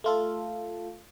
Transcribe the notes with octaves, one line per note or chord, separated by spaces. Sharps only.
A3 F4 A4